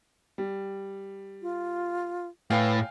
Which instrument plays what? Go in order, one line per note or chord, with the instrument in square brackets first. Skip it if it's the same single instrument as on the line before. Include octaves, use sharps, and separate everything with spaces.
[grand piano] G3
[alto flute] F4
[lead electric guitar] A2 [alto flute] B4 [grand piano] F5 G5 G#5